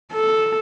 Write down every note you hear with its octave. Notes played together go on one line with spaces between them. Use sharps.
A4